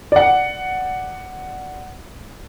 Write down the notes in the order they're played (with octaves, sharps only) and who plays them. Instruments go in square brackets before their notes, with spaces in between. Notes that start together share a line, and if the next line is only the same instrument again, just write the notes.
[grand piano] D5 F#5